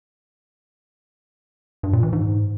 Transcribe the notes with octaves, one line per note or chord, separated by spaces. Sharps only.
G2
A#2
E3
G#2